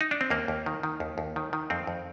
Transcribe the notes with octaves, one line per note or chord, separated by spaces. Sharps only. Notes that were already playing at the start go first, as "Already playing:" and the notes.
D#4
D4
C4
D#2 A#3
D#2
D#3
D#3
D#2
D#2
D#3
D#3
F2 C4
F2